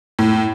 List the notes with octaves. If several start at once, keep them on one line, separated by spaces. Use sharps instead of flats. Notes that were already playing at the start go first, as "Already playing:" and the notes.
A2